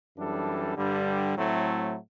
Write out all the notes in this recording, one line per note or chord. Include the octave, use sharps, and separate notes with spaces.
F#2 E3 G3 D4 A4
G2 D3 G3
A2 F#3 A3 C4 E4